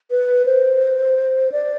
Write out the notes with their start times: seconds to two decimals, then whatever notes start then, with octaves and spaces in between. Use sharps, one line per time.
0.11 B4
0.45 C5
1.52 D5